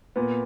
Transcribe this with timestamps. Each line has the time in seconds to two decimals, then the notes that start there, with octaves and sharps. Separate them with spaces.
0.16 A#2 B3